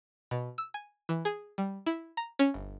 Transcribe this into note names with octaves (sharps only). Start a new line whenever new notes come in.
B2
E6
G#5
E3
G#4
G3
E4
A#5
C#4
G1